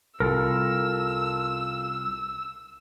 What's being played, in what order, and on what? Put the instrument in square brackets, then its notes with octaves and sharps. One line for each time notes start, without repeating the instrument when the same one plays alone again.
[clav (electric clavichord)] C2 [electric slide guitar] F4 A4 A#4 [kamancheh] E6